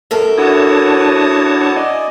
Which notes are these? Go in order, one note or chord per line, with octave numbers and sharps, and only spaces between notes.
F#2 A4 A#4
D4 E4 F#4 C#5 A5 D#6
D5 D#5 G#5